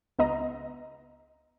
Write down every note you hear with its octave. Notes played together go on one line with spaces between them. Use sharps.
C#2 B3 D#5 A#5